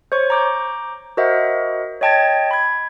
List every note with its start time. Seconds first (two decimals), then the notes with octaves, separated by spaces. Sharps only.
0.12 C5 C#5 C#6
0.30 A#5 D6 G6
1.17 F#4 A#4 C5 D#5 E5 F#5
2.01 C#5 D#5 G5 A5 G#6 A6
2.51 B5 G#6